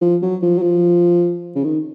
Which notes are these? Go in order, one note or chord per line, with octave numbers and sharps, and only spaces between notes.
F3
F#3
F3
F#3
F3
C#3
D#3